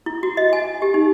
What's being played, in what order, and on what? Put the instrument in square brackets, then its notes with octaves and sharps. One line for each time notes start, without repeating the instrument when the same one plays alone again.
[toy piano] E4
F#4
D#5
G#5
G4
D#4